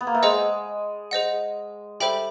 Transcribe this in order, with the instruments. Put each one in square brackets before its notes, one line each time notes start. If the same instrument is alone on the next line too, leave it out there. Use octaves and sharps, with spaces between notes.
[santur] B3
A#3
A3
[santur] G#3 [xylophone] G#4 C5 D#5 F#5
[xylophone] G#4 C5 D#5 F#5
[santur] G3 [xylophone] A4 C5 E5 G5 B5